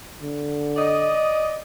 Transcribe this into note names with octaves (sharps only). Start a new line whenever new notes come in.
D3
D5 D#5